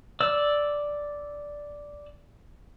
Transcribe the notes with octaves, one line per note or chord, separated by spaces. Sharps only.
D5 E6